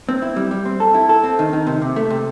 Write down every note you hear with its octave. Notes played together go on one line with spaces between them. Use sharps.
C4
E4
G3
G3
C4
A4
E4
A4
C4
D#3
D#3
C3
C3
A3
C3